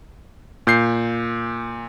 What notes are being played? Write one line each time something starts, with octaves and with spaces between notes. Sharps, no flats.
A#2 G6 C7